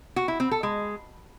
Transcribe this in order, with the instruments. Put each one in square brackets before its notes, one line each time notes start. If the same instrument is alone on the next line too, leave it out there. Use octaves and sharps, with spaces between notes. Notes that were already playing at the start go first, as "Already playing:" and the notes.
[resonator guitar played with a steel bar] F#4
E4
C4
A4
G#3